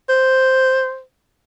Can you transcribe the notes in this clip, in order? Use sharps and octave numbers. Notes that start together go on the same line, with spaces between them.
C5